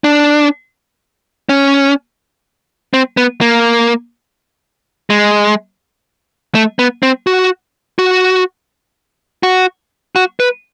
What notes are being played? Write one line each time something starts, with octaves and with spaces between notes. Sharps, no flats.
D4
C#4
C4
B3
A#3
G#3
A3
B3
C4
F#4
F#4
F#4
F#4
B4